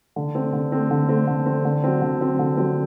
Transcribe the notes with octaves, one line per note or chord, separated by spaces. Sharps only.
D3
A3 C4
D3
A3 C4
D3
A3 C4
D3
A3 C4
D3
F#3 C4
D3
F#3 C4
D3
F#3 C4